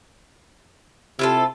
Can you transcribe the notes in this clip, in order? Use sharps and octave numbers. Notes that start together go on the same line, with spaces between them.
C3 E4 F4 A4